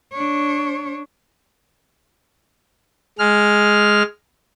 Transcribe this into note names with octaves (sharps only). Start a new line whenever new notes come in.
D4 C#5
G#3 F6